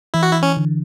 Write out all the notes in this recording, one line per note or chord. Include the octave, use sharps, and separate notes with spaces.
E3 E4
F#4
E4
C#4
D3